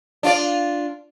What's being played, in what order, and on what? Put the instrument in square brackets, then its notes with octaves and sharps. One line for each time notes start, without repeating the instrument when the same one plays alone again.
[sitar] D4 F4 D5